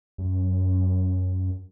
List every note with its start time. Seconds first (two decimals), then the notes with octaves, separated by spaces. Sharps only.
0.18 F#2